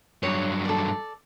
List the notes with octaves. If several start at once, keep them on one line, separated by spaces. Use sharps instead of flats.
G2 F#3 C#5
A4 D5